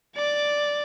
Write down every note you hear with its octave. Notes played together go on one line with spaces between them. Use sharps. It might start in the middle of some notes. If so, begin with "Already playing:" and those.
D5 D6